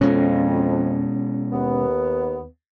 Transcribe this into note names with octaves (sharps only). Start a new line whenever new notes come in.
F2 B2 G#3 C#4
D#2 B3